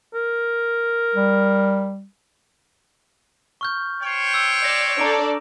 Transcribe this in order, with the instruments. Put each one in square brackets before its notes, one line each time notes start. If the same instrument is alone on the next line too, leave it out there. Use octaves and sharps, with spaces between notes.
[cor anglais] A#4
[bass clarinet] G3
[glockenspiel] C#6 F6 G6
[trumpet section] C5 C#5 G5
[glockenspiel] E6
[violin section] D5 [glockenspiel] A#6 E7
[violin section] D4 A4 D5 [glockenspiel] A#5 D6 D7